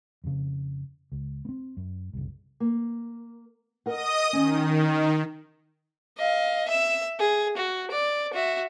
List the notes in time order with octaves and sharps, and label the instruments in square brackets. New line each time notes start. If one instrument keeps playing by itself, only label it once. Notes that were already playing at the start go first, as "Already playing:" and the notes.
[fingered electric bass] F2 C#3
C#2
B3 C4
F#2
F#1 C2
[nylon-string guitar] A#3
[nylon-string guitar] A#4 F#5 [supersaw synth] D#5 D#6
[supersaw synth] D#3 [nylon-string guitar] C#4
[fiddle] D#5 F5
E5 E6
G#4
F#4
D5
F#4 E5